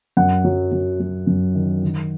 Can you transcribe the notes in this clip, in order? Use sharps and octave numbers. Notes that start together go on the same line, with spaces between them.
F#2 F#5
F#3
F#3
F#3
F#2
D#3
D#3